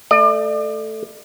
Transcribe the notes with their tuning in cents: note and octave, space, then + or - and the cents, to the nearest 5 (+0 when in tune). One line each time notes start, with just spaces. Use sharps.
A3 +0 D5 +40